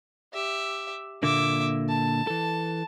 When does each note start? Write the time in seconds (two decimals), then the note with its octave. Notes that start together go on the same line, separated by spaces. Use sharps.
0.34 G4 E5
1.23 A#2 D3 A#3 E5 D6
1.89 A5
2.27 E3 A4